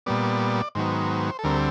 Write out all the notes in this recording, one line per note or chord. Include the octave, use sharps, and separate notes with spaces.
A#2 G3 B3 D5
G#2 D#3 F#3 B3 C5
A4
D2 D3 G3 C4 A#4